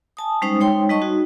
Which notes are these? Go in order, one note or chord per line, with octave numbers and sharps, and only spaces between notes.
G#5 A5 D#6
G3 G#3 C#4 D#4 C5 D#6
G#3 D#4 C#5 G5 C6
G3 D#4 D#5 A5 C#6
D#4 F#4